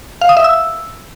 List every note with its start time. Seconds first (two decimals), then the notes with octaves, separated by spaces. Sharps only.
0.21 F5
0.29 D#6
0.37 E5
0.44 E6